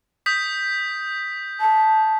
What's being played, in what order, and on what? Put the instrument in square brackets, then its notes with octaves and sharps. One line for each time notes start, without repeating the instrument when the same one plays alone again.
[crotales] D#6 G6 B6
[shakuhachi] A5